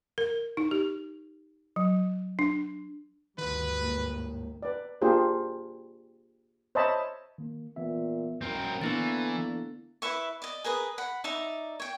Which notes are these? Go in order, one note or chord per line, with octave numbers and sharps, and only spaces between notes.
A#4
D#4
G4
F#3
D4
D2 G2 D#3 B4 C6
G#2 A#3
B4 D5
A#3 D4 F4 G4 G#4 C5
C5 C#5 D#5 E5 A5 B5
D#3 A#3
A#2 E3 B3 E5
F#2 C4 A#4 G6
D3 E3 A#3 B3 D4 E4 A6
E4 B4 E5 C#6
D5 D#5
G#4 A#4 B4 D#6
F#5 B5
D#4 D5 E5 A#5
C#5 G5